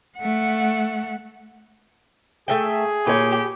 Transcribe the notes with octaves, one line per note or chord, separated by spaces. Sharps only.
A3 F#5
A3 G#4 E5 G5
A#2 G4 B4 C#5